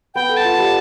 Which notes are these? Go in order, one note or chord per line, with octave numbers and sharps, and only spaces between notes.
B3 G5
A4
A5
F4
G3